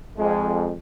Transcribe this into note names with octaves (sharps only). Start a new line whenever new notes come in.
F2 G#3